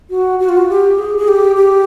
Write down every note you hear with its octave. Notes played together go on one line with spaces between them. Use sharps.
F#4
F#4
F4
F#4
G4
G#4
G#4
G4
G4